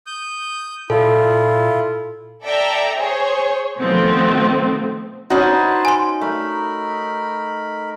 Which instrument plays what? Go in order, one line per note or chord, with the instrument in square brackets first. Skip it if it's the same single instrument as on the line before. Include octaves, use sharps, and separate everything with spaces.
[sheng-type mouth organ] D#6 G6
[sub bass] A#2 [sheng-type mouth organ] E4 F4 [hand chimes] A4
[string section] A4 D5 E5 G5 A#5
G#4 C5 C#5
B2 D#3 F3 A3 B3 C4
[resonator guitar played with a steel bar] C#4 F#4 [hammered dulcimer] D#4 [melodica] B4 C5 A5
[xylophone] G#5 C6
[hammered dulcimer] A3 [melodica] A#4 B5